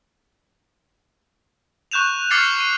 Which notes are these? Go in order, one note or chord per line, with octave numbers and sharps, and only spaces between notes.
C#6 F#6 G6 E7 F7
D6 F6 A6 C7 C#7
D#7